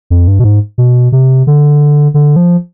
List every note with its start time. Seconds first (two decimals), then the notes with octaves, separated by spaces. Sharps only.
0.10 F2
0.28 G2
0.39 B2
0.44 G#2
0.78 B2
1.12 C3
1.47 D3
2.14 D3
2.36 F3